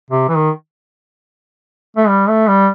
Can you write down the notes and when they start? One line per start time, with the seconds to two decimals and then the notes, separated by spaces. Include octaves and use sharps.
0.10 C3
0.29 E3
0.36 D#3
1.97 A3
2.08 G3
2.28 A3
2.48 G3